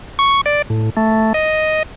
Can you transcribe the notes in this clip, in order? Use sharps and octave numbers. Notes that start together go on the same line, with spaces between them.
C#6
D5
A2
A3
D#5